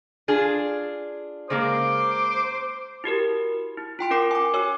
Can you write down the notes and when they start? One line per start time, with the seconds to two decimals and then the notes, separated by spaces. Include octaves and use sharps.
0.28 D4 F4 G#4
1.50 C#3 G#3 A#3 C5 D6
3.04 E4 F#4 G4 A#4
3.77 E4
3.99 F4 G5 C6 D7
4.11 C#4 A#4 D6 C7
4.31 G#5 D6
4.53 F#4 C#5 G#5 E6